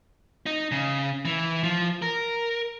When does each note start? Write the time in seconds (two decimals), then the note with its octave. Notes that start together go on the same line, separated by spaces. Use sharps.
0.46 D#4
0.71 C#3
1.25 E3
1.64 F3
2.02 A#4